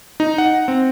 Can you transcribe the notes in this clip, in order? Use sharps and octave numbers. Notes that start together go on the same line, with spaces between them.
D#4
F#5
C4